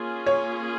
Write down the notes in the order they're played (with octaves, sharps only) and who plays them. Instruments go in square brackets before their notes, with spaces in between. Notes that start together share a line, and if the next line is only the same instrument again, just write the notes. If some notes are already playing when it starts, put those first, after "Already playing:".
Already playing: [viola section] A#3 C#4 F4 G#4
[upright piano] C#5